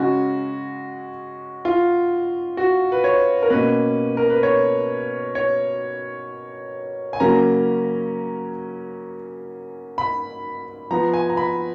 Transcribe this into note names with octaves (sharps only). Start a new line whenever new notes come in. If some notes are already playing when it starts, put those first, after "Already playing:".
Already playing: C#3 G#3 C#4 F#4
F4
F#4
B4
C#5
A#4
B2 A#3 C#4 B4
A#4
B4
C#5
C#5
G#5
C#3 F#3 A#3 C#4 A#5
B5
F3 B3 A#5
G#5
A#5
B5